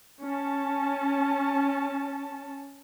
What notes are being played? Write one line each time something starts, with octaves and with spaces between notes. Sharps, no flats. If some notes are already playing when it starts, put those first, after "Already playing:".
C#4 A5